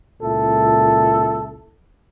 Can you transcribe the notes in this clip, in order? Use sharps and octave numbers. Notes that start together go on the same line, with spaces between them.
C#2 A#2 E4 A4